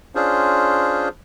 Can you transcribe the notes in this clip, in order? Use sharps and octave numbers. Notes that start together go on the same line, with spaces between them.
C#4 D4 F4 G#4 C5